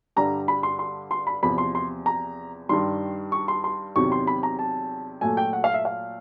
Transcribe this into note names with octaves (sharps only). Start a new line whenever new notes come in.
G2 D3 G3 A#5
B5
C6
C6
C6
B5
E2 C3 F3 B5
C6
C6
A#5
G2 D#3 G3 C6
C#6
C6
C6
E2 C3 D#3 F#3 C#6
C6
B5
A#5
A5
A#2 F#3 A3 G#5
G5
F#5
F5
E5
F5